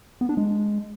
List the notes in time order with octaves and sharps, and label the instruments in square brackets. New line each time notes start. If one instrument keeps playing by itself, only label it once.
[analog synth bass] B3
D4
G#3